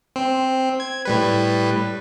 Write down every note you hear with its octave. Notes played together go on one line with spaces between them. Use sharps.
C4
G#6
A2 G3 B4